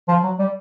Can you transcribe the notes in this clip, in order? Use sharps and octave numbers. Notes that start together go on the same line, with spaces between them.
F3
F#3
G3